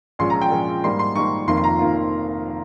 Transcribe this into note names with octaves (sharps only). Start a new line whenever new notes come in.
A#1 A#2 G#3 C#4 C6
A#5
G5
A#1 A#2 G#3 C#4
G#2 G3 A#3 D#4 C6
C6
G#2 G3 A#3 D#4 C#6
F1 F2 D#3 A#3 F4 C6
C6
A#5
F2 D#3 A#3 F4